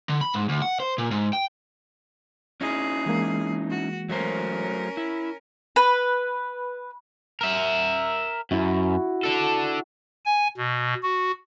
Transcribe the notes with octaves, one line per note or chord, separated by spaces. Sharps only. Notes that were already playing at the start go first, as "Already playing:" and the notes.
D3
B5
G#2
D2
F#5
C5
A#2
G#2
G5
C#4 D#4 E4 G#4
E3 G#3 A#3
F#4
F#3 A3 C#4 A#4 C5
E4
B4
A#4 E5
F#2 E4 F#4
D4 A4
G#5
B2
F#4